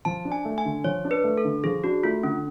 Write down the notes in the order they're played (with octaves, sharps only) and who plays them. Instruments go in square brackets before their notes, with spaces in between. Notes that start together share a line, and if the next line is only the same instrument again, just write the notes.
[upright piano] F3 [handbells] A5
[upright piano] D4
[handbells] G#5
[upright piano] A3
[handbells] G#5
[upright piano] D3
[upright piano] F3 [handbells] C#5
[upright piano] D4
[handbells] B4
[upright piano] A3
[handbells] A4
[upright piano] D3
[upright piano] F3 [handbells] G#4
[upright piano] D4 [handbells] F#4
[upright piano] A3 [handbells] F4
[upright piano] D3 [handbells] C#4